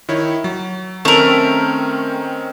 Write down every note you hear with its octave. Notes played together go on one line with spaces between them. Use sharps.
D#3 E4 C#5
F#3
D#3 A3 C4 C#4 A#4